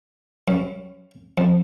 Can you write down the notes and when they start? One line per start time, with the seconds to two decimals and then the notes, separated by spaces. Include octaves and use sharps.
0.48 F#2
1.38 F2